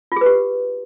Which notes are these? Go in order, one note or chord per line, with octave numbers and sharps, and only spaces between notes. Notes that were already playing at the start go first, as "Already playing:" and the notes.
F4 G4 G#4 B4